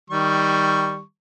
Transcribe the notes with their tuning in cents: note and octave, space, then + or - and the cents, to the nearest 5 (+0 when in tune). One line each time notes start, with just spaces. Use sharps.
D#3 +0 G3 +0 C#6 +0